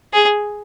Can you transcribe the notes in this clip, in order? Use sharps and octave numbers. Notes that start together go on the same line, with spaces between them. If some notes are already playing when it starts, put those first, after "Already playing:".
G#4